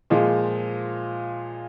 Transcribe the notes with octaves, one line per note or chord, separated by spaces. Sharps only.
A#2 F3 G#3